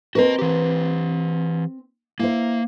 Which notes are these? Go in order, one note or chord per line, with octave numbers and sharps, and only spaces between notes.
C4 F#4 A#4 B4 D#5
E3 G4
A#3 E4 C5